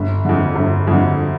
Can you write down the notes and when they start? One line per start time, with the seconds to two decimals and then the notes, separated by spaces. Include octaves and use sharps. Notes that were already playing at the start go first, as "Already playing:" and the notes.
Already playing: G1
0.25 F2 D3
0.55 G1
0.87 F2 D3